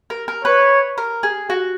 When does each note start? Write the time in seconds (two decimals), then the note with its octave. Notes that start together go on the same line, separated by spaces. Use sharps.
0.10 A#4
0.28 A#4
0.45 B4 C#5
0.98 A#4
1.23 G#4
1.50 F#4